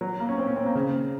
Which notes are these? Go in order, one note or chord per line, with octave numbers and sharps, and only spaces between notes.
F#3
A#3
C#4
C4
C#4
C4
A#3
C#3